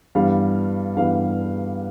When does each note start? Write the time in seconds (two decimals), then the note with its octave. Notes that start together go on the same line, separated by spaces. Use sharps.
0.15 G2 E3 G3 B3 F5
0.97 G2 E3 G3 B3 F5